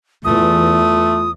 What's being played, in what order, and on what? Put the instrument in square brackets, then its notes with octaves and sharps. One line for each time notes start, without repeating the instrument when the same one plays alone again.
[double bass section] E2 E3 [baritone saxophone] A3 [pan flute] F4 [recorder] D#6